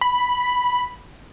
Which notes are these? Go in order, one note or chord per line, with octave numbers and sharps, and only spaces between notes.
B5